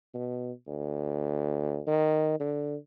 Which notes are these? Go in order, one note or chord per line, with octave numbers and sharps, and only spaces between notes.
B2
D2
D#3
D3